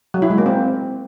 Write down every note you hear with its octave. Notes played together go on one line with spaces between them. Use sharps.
F#3
E4
G#3
A#3
C4